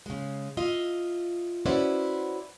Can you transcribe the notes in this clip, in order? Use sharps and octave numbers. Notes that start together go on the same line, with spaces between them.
C#3 G#3
F4 D#5 E5
C#4 E4 F#4 B4 C5 D5